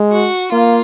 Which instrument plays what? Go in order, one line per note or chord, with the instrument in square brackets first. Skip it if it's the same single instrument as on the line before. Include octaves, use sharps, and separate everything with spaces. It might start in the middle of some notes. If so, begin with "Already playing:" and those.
Already playing: [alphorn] G#3
[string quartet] F#4
[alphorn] A#3 [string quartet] F4